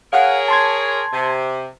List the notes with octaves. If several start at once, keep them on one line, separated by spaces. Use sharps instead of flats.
G#4 A#4 C#5 F5 F#5
A5 C6 G#6
C3